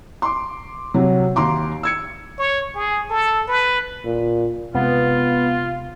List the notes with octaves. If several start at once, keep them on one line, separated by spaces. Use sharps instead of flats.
C6 D6
C3 F#3
D#2 A#5 C6 D6
E6 G#6 C#7
C#5
G#4
A4
B4
A#2
C3 G#3 B3 F4